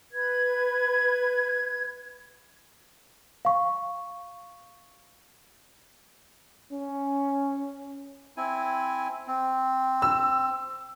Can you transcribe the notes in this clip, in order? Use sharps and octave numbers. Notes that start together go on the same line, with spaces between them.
B4 G#6
F5 C#6
C#4
C4 E4 G#5
C4
E6